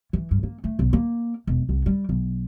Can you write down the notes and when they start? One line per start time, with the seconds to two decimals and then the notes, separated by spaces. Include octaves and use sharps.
0.13 E3
0.31 G2
0.43 A#3
0.64 A3
0.79 B1
0.93 A#3
1.47 E1
1.69 C2
1.86 G3
2.09 B1